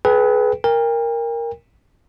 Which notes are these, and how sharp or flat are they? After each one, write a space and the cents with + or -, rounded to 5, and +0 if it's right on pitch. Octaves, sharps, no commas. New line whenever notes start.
G#4 +35 B4 +0 G5 +0
A#4 +0 G5 +40